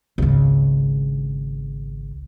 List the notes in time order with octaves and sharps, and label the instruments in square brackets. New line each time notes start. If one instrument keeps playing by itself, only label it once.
[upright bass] G#1 C#2